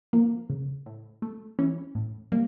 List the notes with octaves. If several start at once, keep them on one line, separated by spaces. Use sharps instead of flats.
F3 A#3
C#3
A2
A3
E3 C#4
A2
G3 A#3